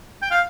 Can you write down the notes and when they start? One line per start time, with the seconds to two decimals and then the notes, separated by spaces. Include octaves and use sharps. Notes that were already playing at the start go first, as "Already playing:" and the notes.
0.22 G5
0.31 F5